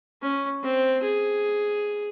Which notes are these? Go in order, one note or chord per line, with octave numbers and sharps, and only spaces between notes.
C#4
C4
G#4